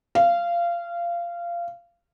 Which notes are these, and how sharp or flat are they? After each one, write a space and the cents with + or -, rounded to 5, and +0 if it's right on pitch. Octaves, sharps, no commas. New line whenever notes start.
F5 -20